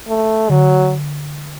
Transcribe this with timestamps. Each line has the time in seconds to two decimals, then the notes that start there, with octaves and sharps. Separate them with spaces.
0.08 A3
0.49 D3 F#3